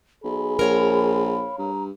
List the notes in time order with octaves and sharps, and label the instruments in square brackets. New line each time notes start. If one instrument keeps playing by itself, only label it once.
[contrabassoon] B1 [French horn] G#4 [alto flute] B5
[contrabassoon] A#1 [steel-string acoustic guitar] A#4 C#5 F5
[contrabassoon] G2 [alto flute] A#5